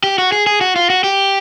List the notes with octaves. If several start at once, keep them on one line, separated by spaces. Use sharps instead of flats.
G4
F#4
G#4
G#4
F#4
F4
F#4
G4